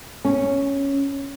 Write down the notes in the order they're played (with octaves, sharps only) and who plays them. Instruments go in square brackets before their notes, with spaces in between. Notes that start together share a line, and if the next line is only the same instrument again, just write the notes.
[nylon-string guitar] C#4